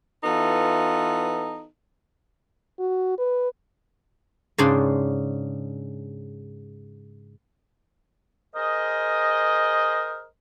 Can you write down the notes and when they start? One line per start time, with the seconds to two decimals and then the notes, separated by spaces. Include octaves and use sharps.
0.24 E3 B3 D#4 F4 A4
2.79 F#4
3.18 B4
4.58 G#2 C#3 D4 C5
8.56 G#4 A#4 C5 D#5